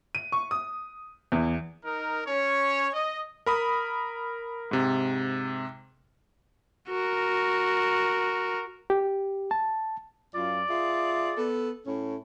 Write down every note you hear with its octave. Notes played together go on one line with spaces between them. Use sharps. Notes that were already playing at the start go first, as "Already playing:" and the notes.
D#7
C#6
D#6
E2
D#4 A#4
C#4 C#5
D#5
A#4 B5 D#6
G#2 C3
F#4 A#4
G4
A5
F#2 F4 D5
F4 G#4 E5
B3 A4
A2 C#4